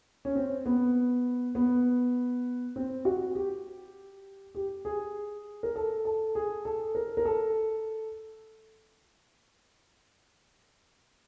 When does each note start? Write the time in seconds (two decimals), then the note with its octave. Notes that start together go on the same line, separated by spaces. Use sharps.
0.25 C#4
0.35 C4
0.66 B3
1.55 B3
2.76 C4
3.05 F#4
3.35 G4
4.55 G4
4.85 G#4
5.63 A#4
5.76 A4
6.05 A4
6.35 G#4
6.65 A4
6.95 A#4
7.17 A#4
7.25 A4